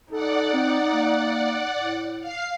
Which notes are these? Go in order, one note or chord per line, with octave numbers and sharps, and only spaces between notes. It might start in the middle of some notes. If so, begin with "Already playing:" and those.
D#4 A4 D5 F#5
C4
A#3
A2
F5 C7